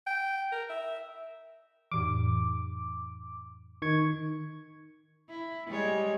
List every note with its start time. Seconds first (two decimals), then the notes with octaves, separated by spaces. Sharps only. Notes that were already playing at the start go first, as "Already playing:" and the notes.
0.07 G5
0.52 A#4
0.70 E5
1.92 F2 A2 E3 D6
3.82 D#3 C#6 G#6
5.30 E4
5.67 G3 G#3 C#5